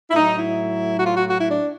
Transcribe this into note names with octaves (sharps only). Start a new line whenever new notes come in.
E4
A2 F#3 D#4
E4
F#4
F4
F#4
F#4
E4
D4